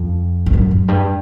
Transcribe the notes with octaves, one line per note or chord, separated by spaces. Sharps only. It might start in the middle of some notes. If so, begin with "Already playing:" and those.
Already playing: F2
G2
F#2
F#2
G2